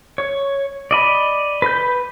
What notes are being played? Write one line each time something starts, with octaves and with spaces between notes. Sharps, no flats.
C#5
D5 D#5 B5
B4 G6